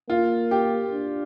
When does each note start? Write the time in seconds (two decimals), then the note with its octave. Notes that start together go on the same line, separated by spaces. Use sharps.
0.09 A#3 F4
0.51 G4
0.93 D4